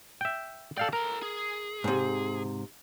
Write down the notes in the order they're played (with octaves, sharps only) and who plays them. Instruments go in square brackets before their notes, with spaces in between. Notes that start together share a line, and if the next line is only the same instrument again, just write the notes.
[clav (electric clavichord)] E5 G5
[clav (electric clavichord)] A4 F5 G5 [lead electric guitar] D5
[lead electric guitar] A4 A#5 [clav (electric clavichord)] A#4
[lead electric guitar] G#4
[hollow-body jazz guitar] G#2 C3